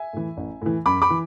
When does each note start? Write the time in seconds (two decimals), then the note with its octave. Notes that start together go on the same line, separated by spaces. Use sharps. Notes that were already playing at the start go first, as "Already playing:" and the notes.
Already playing: E5 G#5
0.13 A2 E3
0.37 A1
0.62 A2 E3
0.86 F#2 B5 D6
1.02 B5 D6
1.10 E3